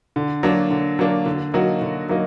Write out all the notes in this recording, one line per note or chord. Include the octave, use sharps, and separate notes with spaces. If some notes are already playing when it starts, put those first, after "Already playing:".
D3
F#3 A#3 D4
D3
F#3 A#3 D4
D3
F#3 A#3 D#4 F#4
D3
F#3 A#3 D#4